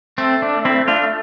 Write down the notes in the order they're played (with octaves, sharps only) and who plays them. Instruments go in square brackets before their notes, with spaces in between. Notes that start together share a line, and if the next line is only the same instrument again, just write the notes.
[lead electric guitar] A3 [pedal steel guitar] C4
[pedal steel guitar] D4
C4 E4
D4 F4